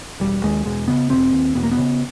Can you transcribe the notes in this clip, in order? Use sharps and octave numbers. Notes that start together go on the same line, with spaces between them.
E1 G3
D#2 G#3
E1 G#3
C#3 B3
E1 C4
D#2
E1 B3
A#3
B3
C#3